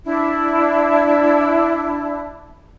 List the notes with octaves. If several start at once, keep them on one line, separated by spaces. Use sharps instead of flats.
D4 E4